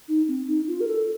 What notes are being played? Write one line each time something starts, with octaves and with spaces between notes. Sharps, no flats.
D#4
C4
D#4
F4
A#4
A4